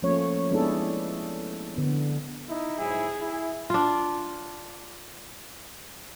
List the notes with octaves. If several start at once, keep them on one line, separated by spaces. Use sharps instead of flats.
F3 A3 A#3 C#4 C#5
G#3 B3 D4 E4 G#4 A4
D3 B3
D#4 E4
G#2 F#3 E4 G#4
E4
D4 F4